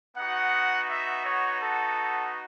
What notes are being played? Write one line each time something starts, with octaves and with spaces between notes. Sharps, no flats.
B3 D#4 F#4 F#5
E5
C#5
A4